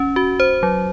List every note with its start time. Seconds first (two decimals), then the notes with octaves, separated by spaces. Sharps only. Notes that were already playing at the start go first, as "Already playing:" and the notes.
Already playing: C#4
0.16 F#4
0.40 C5
0.63 F#3